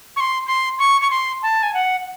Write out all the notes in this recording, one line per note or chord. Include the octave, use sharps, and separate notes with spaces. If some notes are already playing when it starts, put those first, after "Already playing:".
C#6
C6
C6
C#6
C#6
C6
A5
G#5
F#5